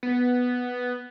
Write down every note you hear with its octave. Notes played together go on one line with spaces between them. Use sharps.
B3